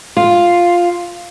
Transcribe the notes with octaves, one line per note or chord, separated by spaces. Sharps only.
F4